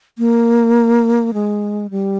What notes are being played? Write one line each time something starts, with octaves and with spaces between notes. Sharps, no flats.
A#3
G#3
G3